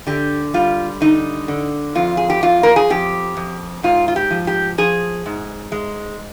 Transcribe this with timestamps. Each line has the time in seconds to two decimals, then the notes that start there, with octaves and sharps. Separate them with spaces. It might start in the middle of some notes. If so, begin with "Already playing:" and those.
0.07 D3 G4
0.54 G3 F4
1.01 D3 D#4
1.48 D3
1.95 F2 F4
2.17 G#4
2.30 G4
2.43 F2 F4
2.63 A#4
2.76 G#4
2.90 F2 G4
3.37 F2
3.83 G#2 F4
4.08 F4
4.16 G4
4.31 F3
4.47 G4
4.78 F3 G#4
5.26 G#2
5.72 G#3